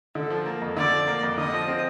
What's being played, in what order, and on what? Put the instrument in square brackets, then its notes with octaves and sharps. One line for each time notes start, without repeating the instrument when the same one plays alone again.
[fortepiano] D3 [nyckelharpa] A4
[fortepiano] F3
A#3
F2
[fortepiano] D3 [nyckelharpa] D5
[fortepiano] F3
A#3
F2
[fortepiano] D3 [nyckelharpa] D#5
[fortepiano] F3
C4